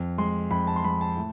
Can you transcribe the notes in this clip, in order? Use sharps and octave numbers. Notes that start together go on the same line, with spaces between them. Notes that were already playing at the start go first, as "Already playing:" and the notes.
Already playing: F2
G#3 C6
F2 B5
A5
C6
G#3 B5
A5
A2